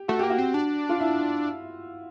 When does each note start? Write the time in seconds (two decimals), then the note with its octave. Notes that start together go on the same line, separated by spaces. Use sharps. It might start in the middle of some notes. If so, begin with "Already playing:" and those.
Already playing: G4
0.08 A3 F#4
0.19 A#3 G4
0.30 F#4
0.38 C4
0.54 D4
0.89 F4
1.00 E4